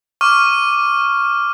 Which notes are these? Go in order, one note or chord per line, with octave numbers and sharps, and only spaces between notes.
C#6 D6 F6 D#7